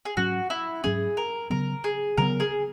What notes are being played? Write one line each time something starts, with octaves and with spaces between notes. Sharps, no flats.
G#4
G#2 F#3 C#4 F#4
E4
G#2 F#3 C#4 G#4
A#4
C#3 F#3 B3 A#4
G#4
C#3 F#3 B3 A#4
G#4